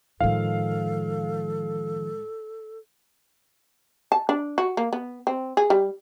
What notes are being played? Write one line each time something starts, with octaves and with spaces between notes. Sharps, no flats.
A2 D#3 F3 G#3 A4 F5
A5
D4
F#4
A#3
B3
C4
G#4
G3